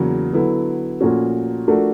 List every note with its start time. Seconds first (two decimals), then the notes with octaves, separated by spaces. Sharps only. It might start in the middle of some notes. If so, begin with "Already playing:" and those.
Already playing: E2 C#3 F#3 A#3
0.33 D3 F#3 B3 E4
1.00 A#2 F3 A3 C#4 F#4
1.68 F3 A3 D4 F#4 A#4